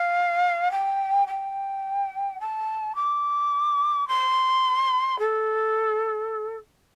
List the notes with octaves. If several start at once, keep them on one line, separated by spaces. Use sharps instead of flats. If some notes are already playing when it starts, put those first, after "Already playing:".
Already playing: F5
G5
G5
A5
D6
C6
A4